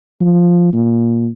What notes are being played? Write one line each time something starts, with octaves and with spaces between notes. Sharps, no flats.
F3
A#2